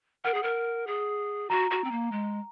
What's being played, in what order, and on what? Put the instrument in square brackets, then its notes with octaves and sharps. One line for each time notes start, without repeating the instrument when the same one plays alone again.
[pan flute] A#4 [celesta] F#5
[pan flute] G#4
A#4
G#4
[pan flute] F#4 [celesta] A#5
[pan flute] F#4
C4
A#3
G#3